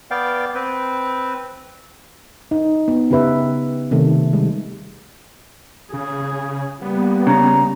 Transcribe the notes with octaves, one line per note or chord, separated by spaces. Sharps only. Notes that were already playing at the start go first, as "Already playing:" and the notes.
B3 D5 F5 G5
C4 B4
D#4
B3
C#3 G4 B4 E5
C3 D#3 A3
G3 G#3
C#3 G#4
G3 A#3 B3
C#3 A#5